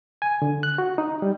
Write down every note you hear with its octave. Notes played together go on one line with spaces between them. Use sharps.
G#5
D3
F#6
F#4
D#4
G3